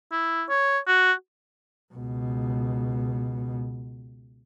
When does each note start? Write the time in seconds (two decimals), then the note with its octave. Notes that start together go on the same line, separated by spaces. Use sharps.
0.12 E4
0.49 C#5
0.87 F#4
1.94 C#2 B2